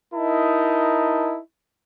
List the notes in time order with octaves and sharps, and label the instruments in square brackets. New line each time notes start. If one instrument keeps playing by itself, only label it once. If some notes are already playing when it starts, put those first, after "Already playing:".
[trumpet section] D#4 E4 A#4 D#5 A5